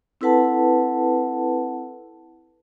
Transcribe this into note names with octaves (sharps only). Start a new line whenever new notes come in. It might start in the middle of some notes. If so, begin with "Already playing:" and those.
C4 E4 A4 B4 F#5 A5